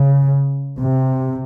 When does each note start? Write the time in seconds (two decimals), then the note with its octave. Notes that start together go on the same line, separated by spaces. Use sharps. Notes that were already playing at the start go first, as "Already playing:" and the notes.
Already playing: C#3
0.80 C3